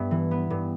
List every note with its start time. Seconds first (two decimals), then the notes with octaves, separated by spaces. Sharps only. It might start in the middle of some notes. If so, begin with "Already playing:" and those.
Already playing: G2 B3 E5
0.11 E3
0.31 B3
0.50 G2